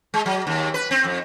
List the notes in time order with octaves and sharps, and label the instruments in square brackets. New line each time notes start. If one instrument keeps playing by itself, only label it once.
[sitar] G#3
F#3
D#2
B4
C4
F2